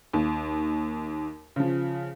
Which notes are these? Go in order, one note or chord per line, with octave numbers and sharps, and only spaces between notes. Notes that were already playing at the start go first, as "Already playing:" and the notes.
D#2
C#3 F3